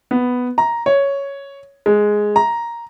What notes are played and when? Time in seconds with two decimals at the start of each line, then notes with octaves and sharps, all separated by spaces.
0.11 B3
0.58 A#5
0.86 C#5
1.86 G#3
2.36 A#5